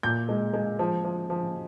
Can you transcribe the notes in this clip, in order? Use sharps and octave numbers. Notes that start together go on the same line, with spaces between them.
A#2 G6
G#3
G#3
F3
F3
F3